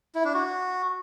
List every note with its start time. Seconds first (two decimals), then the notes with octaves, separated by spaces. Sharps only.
0.15 E4
0.25 D4
0.34 F#4